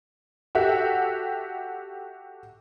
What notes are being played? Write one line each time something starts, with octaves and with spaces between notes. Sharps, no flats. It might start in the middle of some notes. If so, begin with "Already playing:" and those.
F#4 G4 A4 E5 F#5